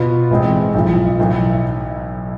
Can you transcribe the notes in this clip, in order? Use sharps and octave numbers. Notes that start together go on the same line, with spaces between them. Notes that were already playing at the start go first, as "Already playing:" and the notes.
Already playing: B2 B3 F4
A1 A2 E3 G#3 C4
B1 A2 F3
B1 A2 E3